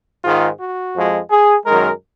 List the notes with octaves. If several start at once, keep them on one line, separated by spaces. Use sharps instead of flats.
G#2 D#3 G#3 F4
F#4
F2 F3 G#3
G#4
F#2 D#3 G#3 A#4